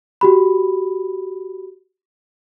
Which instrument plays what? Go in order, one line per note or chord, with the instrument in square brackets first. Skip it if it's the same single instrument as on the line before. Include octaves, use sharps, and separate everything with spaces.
[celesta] F#4 G4 B5